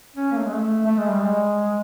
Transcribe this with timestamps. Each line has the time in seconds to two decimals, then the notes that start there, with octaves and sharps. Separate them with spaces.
0.16 C#4
0.31 A#3
0.38 A3
0.46 G#3
0.53 A3
0.86 A3
0.98 G#3
1.09 G3
1.21 G#3